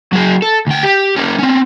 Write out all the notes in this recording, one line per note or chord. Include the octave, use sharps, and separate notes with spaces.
F#3 G#4
A4
D2 G5
G4
A#3 C#4
C4 C#4